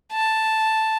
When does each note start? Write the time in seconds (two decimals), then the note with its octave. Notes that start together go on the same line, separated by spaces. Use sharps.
0.13 A5